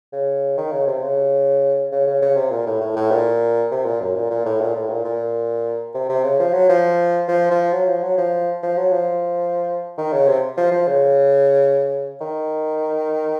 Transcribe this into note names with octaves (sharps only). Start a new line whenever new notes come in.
C#3
D#3
C#3
C3
C#3
C#3
C#3
C#3
C3
A#2
A2
A2
A2
A#2
C3
A#2
F#2
A#2
A#2
A2
A#2
A2
A#2
A#2
C3
C3
C#3
F3
F#3
F3
F3
F3
F#3
F3
F#3
F3
F3
F#3
F3
D#3
C#3
C3
F3
F3
C#3
D#3